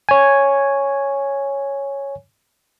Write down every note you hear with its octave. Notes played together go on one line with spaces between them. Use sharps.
C#5 G#5